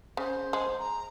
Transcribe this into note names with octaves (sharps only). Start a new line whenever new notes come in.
C#3 C5
G#3
A#5